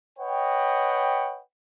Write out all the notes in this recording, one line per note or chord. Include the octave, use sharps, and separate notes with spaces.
B4 C#5 D#5 F#5 G5